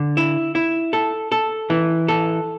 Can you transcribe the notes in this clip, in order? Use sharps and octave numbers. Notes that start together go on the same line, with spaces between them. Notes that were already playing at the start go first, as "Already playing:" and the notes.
Already playing: D3
E4
E4
A4
A4
E3
A4